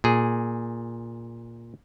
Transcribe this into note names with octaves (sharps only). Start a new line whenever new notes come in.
A#2 G#4